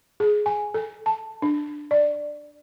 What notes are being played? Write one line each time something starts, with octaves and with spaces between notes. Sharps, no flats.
G#4
G#5
A4
A5
D4
D5